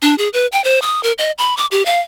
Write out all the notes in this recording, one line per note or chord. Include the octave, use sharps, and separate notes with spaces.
D4
G#4
B4
G5
C5
D#6
A#4
D#5
B5
D6
G4
F5